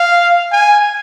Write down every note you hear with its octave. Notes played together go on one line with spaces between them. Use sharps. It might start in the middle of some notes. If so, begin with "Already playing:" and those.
Already playing: F5
G#5